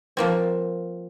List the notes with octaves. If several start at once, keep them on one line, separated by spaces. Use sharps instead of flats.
F3 A#3 C4